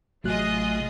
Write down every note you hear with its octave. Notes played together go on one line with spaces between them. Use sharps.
A1 C3 F#3 A3 F4 G#4 D#5 F#6